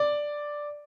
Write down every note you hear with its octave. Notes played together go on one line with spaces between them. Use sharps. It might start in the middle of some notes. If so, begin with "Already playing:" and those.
Already playing: D5